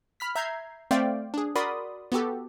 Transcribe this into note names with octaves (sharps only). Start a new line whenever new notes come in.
B5 F6 B6
E5 A#5 G6 G#6 C7
A3 C4 C5 D5 F5 G5
D4 G#4
F#4 A#4 D5 B5 C6 D#6
B3 F#4 G4 A4